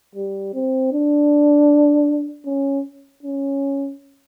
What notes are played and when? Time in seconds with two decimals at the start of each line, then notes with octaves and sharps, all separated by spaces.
0.15 G3
0.54 C4
0.93 D4
2.46 C#4
3.23 C#4